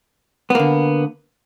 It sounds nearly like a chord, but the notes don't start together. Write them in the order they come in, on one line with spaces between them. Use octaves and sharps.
B3 A#3 D3